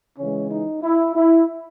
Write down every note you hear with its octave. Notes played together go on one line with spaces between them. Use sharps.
C#3 E3 G#3 C#4
D#4
E4
E4